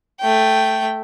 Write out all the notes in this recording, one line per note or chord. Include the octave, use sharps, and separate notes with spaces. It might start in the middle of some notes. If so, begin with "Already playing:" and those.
A3 G5